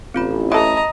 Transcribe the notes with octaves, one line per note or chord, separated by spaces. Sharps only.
A1 C4 F4 B5
E3 A4 D#5 A#5 B5